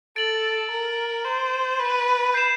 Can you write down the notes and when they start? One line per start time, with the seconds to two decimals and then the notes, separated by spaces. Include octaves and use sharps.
0.16 A4 A6 D7 F#7
0.71 A#4
1.25 C5
1.80 B4
2.34 G6 C7 E7